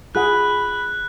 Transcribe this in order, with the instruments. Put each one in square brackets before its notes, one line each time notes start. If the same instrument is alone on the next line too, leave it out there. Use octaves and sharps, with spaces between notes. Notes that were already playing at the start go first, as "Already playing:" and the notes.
[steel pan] F4 G#4 F#5 [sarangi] B5 [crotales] F#6